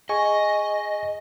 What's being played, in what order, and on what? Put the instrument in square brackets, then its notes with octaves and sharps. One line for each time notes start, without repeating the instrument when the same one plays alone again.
[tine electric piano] G#4 G#5 C#6 [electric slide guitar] D#5